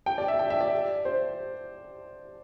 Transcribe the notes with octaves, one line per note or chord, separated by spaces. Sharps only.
G5
D5
E5
G5
E5
D5
C5